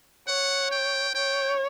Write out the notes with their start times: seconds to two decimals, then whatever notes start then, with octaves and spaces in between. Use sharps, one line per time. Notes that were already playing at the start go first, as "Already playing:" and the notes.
0.28 C#5 F#5
0.71 G5
1.15 C#5 G5